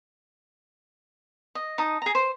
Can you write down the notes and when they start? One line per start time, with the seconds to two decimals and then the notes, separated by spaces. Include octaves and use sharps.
1.55 D#5
1.78 D#4 A5 D#6
2.02 G#4 A#5
2.15 C5